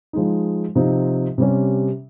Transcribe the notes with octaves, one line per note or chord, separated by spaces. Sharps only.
F3 G#3 D#4
C3 F3 C4 D#4
C3 G3 C#4